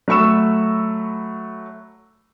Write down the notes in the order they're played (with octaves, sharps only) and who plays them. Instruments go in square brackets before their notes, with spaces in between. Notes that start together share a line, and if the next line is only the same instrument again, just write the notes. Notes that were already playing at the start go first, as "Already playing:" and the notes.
[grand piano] F#3 A3 B5 C#6 E6 E7